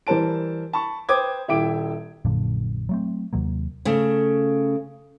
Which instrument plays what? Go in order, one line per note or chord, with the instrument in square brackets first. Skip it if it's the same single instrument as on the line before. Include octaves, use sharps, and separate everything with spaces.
[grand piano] E3 G3 A#4 C5 A5 D7
A5 B5 C#6
B4 C5 G5 D6 D#6 G#6
D#1 E4 E5 G5 D6 D7
[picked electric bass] A#1 F#2 A#2 D3
F#3 A3 C4
D#2 C3 F#3 A#3
[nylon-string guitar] C#3 A3